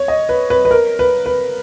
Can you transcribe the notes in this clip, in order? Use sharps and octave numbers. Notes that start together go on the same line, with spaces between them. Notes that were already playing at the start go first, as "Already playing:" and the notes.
Already playing: C#5
D#5
B4
B4
B4
A#4
B4
B4